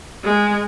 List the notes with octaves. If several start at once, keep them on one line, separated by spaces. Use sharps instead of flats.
G#3